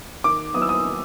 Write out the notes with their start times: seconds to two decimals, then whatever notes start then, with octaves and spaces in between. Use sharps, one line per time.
0.24 D#3 D6
0.54 F#3 B3 E4 D#6
0.62 E6
0.69 D#6
0.84 D#3